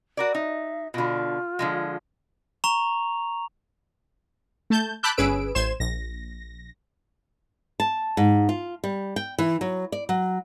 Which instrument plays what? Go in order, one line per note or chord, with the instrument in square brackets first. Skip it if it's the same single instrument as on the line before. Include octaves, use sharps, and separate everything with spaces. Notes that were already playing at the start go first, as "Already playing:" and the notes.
[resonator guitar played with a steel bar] F#4 A#4 D5
[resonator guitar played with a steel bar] D#4 [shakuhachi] E5
[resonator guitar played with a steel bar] B2 D3 [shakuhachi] F4
[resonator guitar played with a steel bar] D3 F3 G#3
[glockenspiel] A#5 C#6 F7
[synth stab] A3 A5 G6
A5 B5 D6 E6 F#6 G6
G1 C#4 G#4 B4 E6 D7
A1 C5 C6 G#6 E7
A#1 A#6
[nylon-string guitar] A5
G#2
F4
G3
G5
E3
F#3
D5
F#3